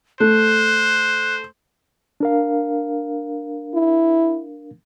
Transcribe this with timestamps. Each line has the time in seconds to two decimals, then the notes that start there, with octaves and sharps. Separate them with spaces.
0.20 A3 C5 F#6
2.20 D4 A#4 F5
3.75 E4